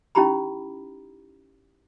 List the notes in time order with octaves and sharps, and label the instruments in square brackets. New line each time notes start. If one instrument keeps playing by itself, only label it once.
[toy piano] C#4 D#4 E4 G4 A#5 B5